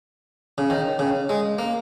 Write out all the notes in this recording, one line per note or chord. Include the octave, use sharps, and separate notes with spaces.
C#3
D#3
C#3
G#3
A#3